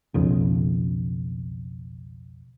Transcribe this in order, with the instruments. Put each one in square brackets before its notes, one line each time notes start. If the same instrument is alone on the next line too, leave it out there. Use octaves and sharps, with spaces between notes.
[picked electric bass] B1 F2 C#3